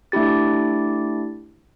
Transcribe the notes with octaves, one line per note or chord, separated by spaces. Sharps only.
A3 D4 E4 G4 A6